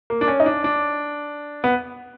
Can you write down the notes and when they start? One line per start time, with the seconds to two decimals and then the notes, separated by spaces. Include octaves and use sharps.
0.10 A#3
0.21 D4
0.28 C#4
0.40 D#4
0.46 D4
0.64 D4
1.64 B3